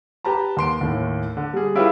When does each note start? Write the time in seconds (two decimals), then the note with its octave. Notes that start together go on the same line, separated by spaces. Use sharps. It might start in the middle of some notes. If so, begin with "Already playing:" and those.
0.25 G4 B4 A5 A#5
0.57 D#2 C6 D7
0.81 D#2 A2
1.37 D3
1.53 G3 G#4
1.75 C#4 E4 F4 G4 G#4 B4